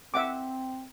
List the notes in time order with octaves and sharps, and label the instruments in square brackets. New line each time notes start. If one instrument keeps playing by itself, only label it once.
[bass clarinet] C4 [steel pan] E5 F#5 D6